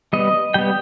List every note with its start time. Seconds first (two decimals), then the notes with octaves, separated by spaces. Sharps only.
0.13 G3 B3 D#5
0.54 G3 B3 G5